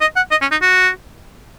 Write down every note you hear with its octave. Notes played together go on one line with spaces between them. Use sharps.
D#5
F#5
D#5
C#4
D#4
F#4